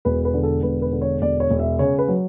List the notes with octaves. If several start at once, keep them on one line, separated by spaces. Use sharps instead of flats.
E1 B4
B4
D3
A4
E1 B4
B4
D3
C#5
E1 D5
C#5
E1
E5
C#3 C#5
B4
F#3